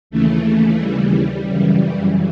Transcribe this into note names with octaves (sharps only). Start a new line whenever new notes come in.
D#2 C#3 E3 A3
A3
G3
F#2 C#3 E3